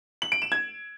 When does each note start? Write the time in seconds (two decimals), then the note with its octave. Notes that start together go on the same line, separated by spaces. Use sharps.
0.22 F#7
0.32 D7
0.42 E7
0.52 G#6